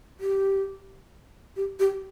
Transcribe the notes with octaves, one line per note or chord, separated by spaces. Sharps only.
G4
G4
G4